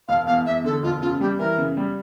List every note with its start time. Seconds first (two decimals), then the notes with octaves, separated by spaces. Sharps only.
0.08 E1 F5
0.27 E2 F5
0.46 E2 E5
0.64 D3 A4
0.83 E1 F4
1.02 C#3 F4
1.21 G3 G4
1.39 E3 A#4
1.58 C#3
1.77 G3